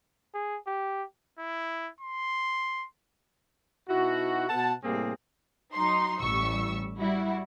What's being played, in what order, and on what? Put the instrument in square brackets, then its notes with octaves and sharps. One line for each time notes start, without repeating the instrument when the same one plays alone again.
[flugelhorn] G#4
G4
[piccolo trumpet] E4
C6
[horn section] B2 D#4 E4 F#4
B2 B3 F#5 A5
A2 C3 G3 A#3 C4 G#4
[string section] F#3 D#4 C6
A1 G3 C#6 E6
G3 E4 F#4